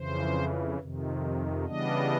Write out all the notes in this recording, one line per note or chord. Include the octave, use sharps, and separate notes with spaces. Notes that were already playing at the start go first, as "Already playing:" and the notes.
Already playing: F2 C#3 E3 C5
F2 C3 D#3
C#3 E3 G3 B3 D4 D#5